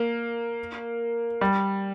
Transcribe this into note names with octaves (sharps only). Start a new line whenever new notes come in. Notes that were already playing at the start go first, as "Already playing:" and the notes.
Already playing: A#3
G3